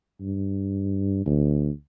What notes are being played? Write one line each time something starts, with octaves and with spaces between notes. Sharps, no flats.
G2
D2